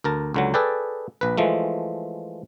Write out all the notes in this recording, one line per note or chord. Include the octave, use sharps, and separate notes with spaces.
D2 A#4 A5
C#2 D3 F#3
G#4 A4 B4 D5 G5
A#1 B4
E3 F3 G#3 A3